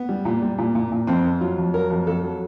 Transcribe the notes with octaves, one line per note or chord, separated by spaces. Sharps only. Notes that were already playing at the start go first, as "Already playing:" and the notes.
Already playing: B3
G3
A#2
G3
A#2
A#2
A#2
F2 C4
F2
F#3 F4
F2
F#3 A#4
F2
F2 A4
F#3